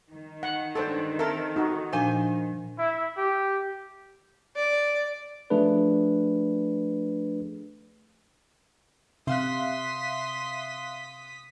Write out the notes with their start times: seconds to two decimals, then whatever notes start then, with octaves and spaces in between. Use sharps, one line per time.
0.13 D#3
0.43 F#5
0.75 G2 G#3 D4 A4 C5
1.19 C4 A4 A#4 E5
1.56 D#4 F#4
1.93 A#2 F3 D4 C5 G#5
2.79 E4
3.17 G4
4.56 D5
5.50 F3 A3 D4 G#4 B4
9.27 C3 E5 F5 C6 D#6 F#6 B6